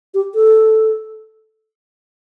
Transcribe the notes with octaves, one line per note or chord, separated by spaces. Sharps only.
G4
A4